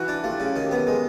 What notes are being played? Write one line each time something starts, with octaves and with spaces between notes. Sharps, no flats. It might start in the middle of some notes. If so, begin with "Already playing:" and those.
Already playing: E3 E4 F#4
D4
A3 F4 G4
C#3
D#3
G4 A4
B3
G#3 G#4 A#4